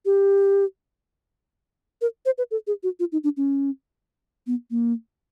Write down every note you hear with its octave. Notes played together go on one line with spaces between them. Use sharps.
G4
A#4
C5
B4
A4
G#4
F#4
F4
D#4
D4
C#4
B3
A#3